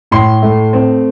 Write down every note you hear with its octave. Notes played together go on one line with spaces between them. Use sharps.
A2 C6
A3
C4